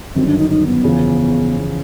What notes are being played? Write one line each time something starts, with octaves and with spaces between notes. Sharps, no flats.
G1 F#2 D#3 F#3 C4
D4
D#4
D#4
B3
F#1 E2 C#3 F3